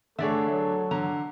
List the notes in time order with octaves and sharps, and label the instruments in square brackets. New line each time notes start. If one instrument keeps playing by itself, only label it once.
[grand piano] D3 D4 C#5 [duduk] A3 [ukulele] G#4 D5 E5 [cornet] A4
[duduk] F#3
[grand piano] D3 [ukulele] A#5